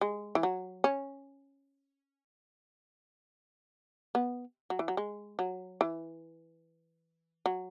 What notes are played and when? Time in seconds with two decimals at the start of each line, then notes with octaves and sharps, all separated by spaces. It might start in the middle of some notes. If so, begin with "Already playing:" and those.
0.01 G#3
0.35 E3
0.43 F#3
0.84 C#4
4.15 B3
4.70 F#3
4.79 E3
4.88 F#3
4.97 G#3
5.39 F#3
5.81 E3
7.46 F#3